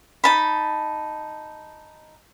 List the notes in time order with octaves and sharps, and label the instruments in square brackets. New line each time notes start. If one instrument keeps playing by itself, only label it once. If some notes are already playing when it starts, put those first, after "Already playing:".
[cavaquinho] D#4 A5 B5